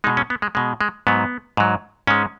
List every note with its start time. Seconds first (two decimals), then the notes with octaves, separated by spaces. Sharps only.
0.04 B2 G#3 D#4
0.17 C#4
0.30 B3
0.42 G#3
0.55 B2 G#3
0.81 G#3
1.07 G#2 F#3 B3
1.57 G#2 F#3
2.07 G#2 G#3 C#4